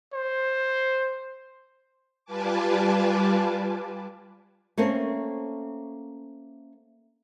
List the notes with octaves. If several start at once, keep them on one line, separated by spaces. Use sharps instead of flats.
C5
G3 F4 B4 G#5 A5 D6
A3 A#3 C4 C#4